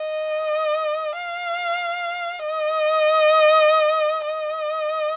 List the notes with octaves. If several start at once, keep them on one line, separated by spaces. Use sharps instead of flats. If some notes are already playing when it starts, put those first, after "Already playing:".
Already playing: D#5
F5
D#5
D#5